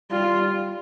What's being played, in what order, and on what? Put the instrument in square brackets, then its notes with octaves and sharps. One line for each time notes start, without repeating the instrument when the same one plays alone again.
[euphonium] G3 [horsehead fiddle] F4